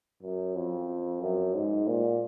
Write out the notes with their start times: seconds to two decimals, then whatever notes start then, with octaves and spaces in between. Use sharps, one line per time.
0.23 F#2
0.55 F2
1.22 F#2
1.54 G#2
1.87 A#2